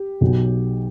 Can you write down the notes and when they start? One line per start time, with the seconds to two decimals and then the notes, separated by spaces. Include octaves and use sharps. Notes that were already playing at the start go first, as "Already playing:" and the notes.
Already playing: G4
0.21 B1 B2 F#3